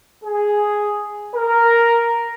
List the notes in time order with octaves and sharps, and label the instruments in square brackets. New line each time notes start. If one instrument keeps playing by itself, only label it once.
[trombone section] G#4
A#4